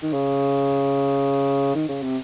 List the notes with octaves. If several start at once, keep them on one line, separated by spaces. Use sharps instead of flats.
D#3
C#3
D#3
C#3
C3